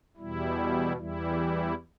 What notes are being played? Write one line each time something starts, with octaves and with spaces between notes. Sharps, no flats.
E2 B2 G3 E4
E2 E3 G3 E4